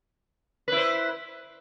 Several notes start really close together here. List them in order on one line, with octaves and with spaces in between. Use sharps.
B4 E4 C5